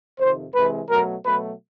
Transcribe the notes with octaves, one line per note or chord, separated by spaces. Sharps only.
F2 C3 D#3 C5
C3 E3 G#3 B4
B2 F#3 A3 A#4
B2 F#3 A3 B4